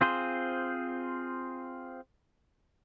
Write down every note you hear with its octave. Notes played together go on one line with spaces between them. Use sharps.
C4 F4 G#4 C5